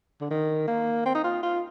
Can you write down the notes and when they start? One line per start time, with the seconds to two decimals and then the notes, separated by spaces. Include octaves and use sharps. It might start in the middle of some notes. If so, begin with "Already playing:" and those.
0.21 D3
0.31 D#3
0.68 A#3
1.06 C4
1.15 D#4
1.24 F4
1.43 F4